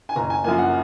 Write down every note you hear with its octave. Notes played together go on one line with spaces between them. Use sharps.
G#5
F#1 A#5
G#5
F#2 F3 A#3 G#5
F#5